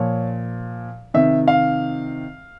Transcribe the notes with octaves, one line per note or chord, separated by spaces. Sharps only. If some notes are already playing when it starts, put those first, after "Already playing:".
Already playing: A#2 F3 C#5
C3 D#3 E5
F5